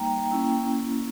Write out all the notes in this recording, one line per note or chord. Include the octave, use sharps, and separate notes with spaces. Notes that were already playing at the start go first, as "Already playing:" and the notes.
Already playing: G3 A#3 D#4 G5 A#5
A#3 C#4 E4